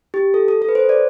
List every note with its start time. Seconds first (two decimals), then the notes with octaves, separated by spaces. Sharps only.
0.14 G4
0.34 A4
0.48 A4
0.62 A4
0.69 B4
0.75 C5
0.89 D5